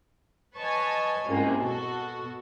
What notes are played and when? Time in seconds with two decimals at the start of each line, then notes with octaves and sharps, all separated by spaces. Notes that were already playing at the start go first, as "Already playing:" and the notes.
0.57 B4 C#5 D#5 G#5 A5 C#6
1.28 C2 G#2 G#3 A#3 C#4 F4
1.58 B2 F#4 A4